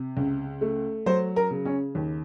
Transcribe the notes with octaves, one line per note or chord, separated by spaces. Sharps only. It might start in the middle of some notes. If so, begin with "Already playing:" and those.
Already playing: C3
C#2
A3
F#3 C5
A#4
C#3
C#4
D#2